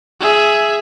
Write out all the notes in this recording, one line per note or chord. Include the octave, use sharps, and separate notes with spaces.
G#4 E5